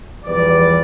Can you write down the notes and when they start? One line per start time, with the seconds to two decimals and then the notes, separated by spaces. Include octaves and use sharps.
0.25 E2 F3 G3 B4 D5